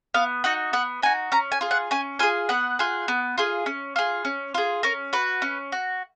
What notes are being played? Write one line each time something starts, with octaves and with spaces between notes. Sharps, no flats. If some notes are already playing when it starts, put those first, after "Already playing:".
B3 F5
D#4 F#4 F#5
B3 F#5
D#4 F#4 G#5
C#4 A#5
G#5
F4 G#4
F#5
C#4 G#5
F4 G#4 G#5
B3 F#5
F4 G#4
B3
F4 G#4
C#4
F4 G#4
C#4
F4 G#4
C#4 A#4
F#4 B4
C#4
F#4